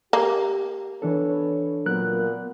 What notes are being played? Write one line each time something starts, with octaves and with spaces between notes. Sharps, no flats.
A#3 G4
E3 B3 D4 A4 B4 C#5
A#2 F#3 B3 A#4 F#6